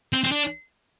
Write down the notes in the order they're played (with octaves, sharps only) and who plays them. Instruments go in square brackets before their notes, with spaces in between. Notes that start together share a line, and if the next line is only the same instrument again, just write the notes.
[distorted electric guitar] C4
C4
D4